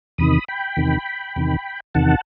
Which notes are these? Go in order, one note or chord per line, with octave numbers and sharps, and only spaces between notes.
E2 C3 D#3 B5 D#6
G5 B5
E2 C3 D#3
E2 C3 D#3
E2 C3 D#3 F#5 A5